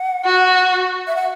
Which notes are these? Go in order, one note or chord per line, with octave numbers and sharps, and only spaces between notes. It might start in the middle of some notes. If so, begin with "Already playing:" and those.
Already playing: F#5
F#4
E5
F#5